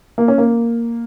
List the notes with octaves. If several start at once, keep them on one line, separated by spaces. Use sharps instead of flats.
A#3
C#4
A#3